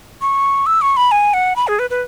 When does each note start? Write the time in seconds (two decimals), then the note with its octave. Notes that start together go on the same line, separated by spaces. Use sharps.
0.21 C#6
0.66 E6
0.81 C#6
0.97 B5
1.11 G#5
1.34 F#5
1.56 B5
1.68 G#4
1.79 B4
1.90 B4